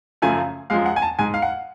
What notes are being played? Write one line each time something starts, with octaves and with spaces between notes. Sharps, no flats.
F#2 C#3 F3 A3 G#5
F#2 F3 G#3 F5
F#5
G#5
A5
G#2 G#3 G#5
F5
F#5